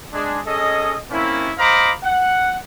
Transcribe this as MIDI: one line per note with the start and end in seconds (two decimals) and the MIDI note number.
0.13 0.40 56
0.13 0.40 62
0.13 0.40 68
0.46 0.95 61
0.46 0.95 68
0.46 0.95 69
0.46 0.95 75
1.11 1.51 58
1.11 1.51 60
1.11 1.51 61
1.11 1.51 64
1.58 1.92 72
1.58 1.92 75
1.58 1.92 77
1.58 1.92 82
1.58 1.92 83
1.58 1.92 86
2.04 2.56 78